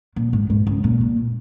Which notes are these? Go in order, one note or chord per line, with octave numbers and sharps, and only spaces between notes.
A#2
G#2
G#2
C#3
A#2
A#2